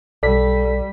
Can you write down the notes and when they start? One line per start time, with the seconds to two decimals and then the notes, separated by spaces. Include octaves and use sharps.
0.23 B1 G3 A4 D5 B6